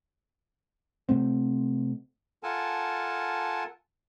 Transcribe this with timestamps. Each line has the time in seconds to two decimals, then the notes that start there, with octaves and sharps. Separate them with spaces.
1.09 C3 A3 C4
2.43 F4 A4 A#4 F#5 G#5 A5